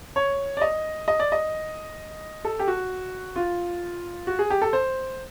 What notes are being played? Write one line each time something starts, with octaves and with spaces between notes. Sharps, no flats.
C#5
D5
D#5
D#5
D5
D#5
A4
G4
F#4
F4
F#4
G#4
G4
A4
C5